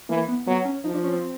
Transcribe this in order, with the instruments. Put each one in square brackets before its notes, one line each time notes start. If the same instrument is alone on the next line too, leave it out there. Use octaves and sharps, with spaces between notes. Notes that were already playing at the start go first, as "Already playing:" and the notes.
[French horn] E3 [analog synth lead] A#3
[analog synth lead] B3
[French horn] F#3 [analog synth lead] B3
[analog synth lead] C#4
[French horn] F3 [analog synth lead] D#4
[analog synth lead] D4
C#4
C4